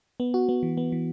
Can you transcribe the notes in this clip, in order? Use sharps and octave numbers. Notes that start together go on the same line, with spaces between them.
B3
F#4
B3
E3
B3
E3